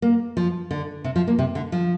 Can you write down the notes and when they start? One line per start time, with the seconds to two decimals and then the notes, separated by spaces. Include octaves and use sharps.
0.02 A#3
0.37 F3
0.71 D3
1.04 C3
1.16 F3
1.27 A#3
1.39 C3
1.55 D3
1.72 F3